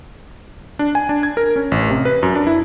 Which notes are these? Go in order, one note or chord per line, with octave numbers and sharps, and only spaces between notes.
D4
G#5
D4
G#6
A#4
C#4
A1
C3
B4
F#2
D4
E4